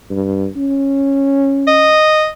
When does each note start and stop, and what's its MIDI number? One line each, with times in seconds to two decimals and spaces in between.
0.11 0.48 43
0.56 1.97 61
1.67 2.28 75